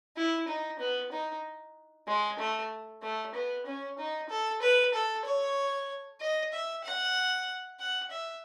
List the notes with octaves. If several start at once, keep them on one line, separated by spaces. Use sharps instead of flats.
E4
D#4
B3
D#4
G#3
A3
A3
B3
C#4
D#4
A4
B4
A4
C#5
D#5
E5
F#5
F#5
E5